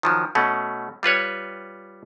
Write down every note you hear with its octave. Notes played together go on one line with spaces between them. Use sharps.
D#3 F3 F#3
B2 A3 C#4
G3 F4 B4 C#5